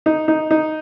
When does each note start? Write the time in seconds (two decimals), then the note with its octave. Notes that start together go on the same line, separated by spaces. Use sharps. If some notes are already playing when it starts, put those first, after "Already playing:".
0.06 D#4
0.28 D#4
0.51 D#4